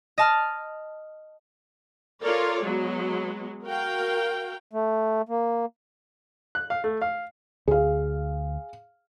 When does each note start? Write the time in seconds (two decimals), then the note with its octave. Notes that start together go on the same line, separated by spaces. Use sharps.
0.18 D#5 A5 F6
2.23 F4 A4 A#4 C#5 D5
2.65 F#3 G#3 B3
3.65 F#4 A#4 F5 G5
4.73 A3
5.29 A#3
6.55 F#6
6.70 F5
6.84 A3
7.02 F5
7.68 D2 G#4 F5